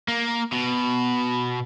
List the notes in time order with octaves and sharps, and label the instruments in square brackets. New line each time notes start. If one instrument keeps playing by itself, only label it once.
[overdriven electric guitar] A#3
B2